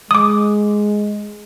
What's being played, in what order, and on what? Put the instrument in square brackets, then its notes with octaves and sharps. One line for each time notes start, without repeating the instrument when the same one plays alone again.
[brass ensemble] G#3 [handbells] D6 D#6